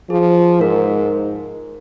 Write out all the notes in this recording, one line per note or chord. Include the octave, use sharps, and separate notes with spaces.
F3 G#4
G#2 A#4